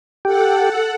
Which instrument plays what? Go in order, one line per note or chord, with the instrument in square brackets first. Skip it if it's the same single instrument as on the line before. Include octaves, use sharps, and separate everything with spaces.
[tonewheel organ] G4 [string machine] A4 F#5